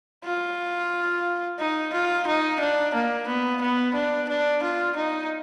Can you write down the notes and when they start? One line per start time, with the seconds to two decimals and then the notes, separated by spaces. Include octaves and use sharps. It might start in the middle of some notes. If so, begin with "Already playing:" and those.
0.24 F4
1.59 D#4
1.93 F4
2.27 D#4
2.60 D4
2.94 A#3
3.27 B3
3.61 B3
3.95 D4
4.28 D4
4.63 F4
4.96 D#4